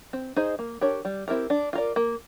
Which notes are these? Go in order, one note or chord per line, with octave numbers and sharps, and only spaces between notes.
C4
D#4 G#4 C5 D#5
A#3
D4 G4 A#4 C#5
G3
C4 E4 G4 A#4
D4
F4 A#4 D5
A#3